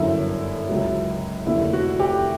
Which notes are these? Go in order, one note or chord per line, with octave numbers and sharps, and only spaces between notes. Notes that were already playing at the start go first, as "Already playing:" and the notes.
Already playing: G1 F#2 D3 E4
C#2 C#3 F#3
F1 D#2 D3 E4
F#4
G4